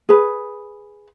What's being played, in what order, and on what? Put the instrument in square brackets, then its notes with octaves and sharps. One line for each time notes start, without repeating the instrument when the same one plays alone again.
[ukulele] G#4 B4